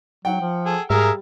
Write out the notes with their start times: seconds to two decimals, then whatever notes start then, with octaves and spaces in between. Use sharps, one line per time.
0.25 F#3 F#5 G5
0.41 F3
0.66 G#4 A4
0.90 G#2 G3 G#4 A#4 E5 F5